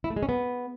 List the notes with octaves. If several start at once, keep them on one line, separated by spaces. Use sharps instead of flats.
E4
A3
G#3
C#4
B3